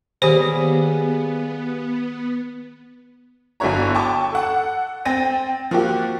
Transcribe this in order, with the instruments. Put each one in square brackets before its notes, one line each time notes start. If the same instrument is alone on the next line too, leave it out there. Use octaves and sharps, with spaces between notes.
[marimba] D#3 C5 [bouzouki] G3 A#3 G#4 [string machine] B3
[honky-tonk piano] G1 D3 E4 F#4 C#5 A#5
G5 A5 C#6 D6
A4 F#5
C4 G5 A6 A#6 D#7
F3 A#3 F#4 G4